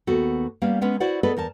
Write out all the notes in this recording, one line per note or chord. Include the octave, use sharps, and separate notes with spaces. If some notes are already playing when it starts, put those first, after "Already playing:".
D#2 B3 F#4 A4
G3 A#3 B3 C#4 G4 F5
G#3 B3 C#4
E4 F#4 C5 D5 F#5
B3 G#4 A4 B4 D5 D#5
E2 A#4 A5